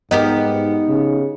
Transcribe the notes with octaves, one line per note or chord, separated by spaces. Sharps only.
G#2 B3 D#4 G4 A#4
C#3